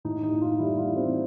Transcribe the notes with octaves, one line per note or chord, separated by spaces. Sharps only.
A2 D#4
D#4
A2
F4
G3 E4
F4
E3
C4